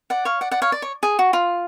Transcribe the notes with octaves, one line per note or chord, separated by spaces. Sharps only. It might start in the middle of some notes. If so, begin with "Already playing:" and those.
D5 F#5
C#5 F5
D5 F#5
D5 F#5
C#5 F5
D5
C#5
G#4
F#4
F4